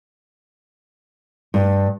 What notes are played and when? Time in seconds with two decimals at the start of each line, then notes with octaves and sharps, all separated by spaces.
1.54 G2